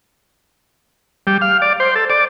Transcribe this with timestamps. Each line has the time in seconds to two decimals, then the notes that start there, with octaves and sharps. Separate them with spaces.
1.27 G3
1.41 F5
1.62 D5
1.80 C5
1.95 A4
2.10 D5